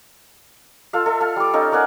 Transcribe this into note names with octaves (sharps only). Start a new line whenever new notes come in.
F4 A4 F5
A4 E5
F5 A5
G3 D6
C#4 D#4 A4 F5
A#4 D5 F#5 G#5